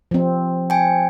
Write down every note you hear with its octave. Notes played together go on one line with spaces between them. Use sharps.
F3 C4
G5 G#5